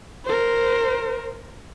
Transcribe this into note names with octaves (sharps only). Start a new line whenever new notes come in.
A#4 C5